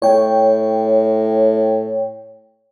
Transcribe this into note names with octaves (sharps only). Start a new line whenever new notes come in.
A2 C#5 G5